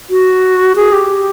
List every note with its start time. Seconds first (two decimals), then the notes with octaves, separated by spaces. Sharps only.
0.10 F#4
0.76 G#4
0.93 G4